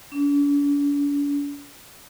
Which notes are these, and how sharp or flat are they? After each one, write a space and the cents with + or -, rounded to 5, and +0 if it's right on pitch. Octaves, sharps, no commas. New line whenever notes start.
D4 -45